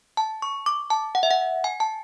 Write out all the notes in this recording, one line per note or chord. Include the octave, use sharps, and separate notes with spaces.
A5
C#6
D6
A5
F#5
E5
F#5
G#5
A5